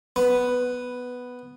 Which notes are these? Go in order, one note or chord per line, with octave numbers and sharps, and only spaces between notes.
B3